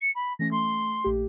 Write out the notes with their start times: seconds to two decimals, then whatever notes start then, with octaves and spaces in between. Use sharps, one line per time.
0.01 C#7
0.15 B5
0.39 E3 A3 C#4 A#6
0.51 A3 C6
1.04 A#1 A3 G4